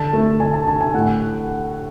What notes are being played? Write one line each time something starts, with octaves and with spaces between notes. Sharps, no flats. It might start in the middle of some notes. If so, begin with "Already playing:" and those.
Already playing: D3 A5
A3
D3 G#5
A5
D3 A5
G#5
A2 F#5